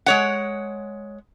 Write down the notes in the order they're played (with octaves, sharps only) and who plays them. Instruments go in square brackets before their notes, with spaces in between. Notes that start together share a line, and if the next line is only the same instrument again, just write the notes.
[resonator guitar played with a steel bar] G#3 C#5 F#5